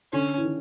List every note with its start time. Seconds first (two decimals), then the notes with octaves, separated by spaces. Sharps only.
0.13 D3 C#4
0.37 E3
0.45 D#3